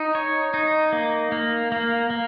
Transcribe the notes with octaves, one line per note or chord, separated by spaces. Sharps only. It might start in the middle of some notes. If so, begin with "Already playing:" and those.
Already playing: D#4
C#5
D#4
A#3
A#3
A#3
A#3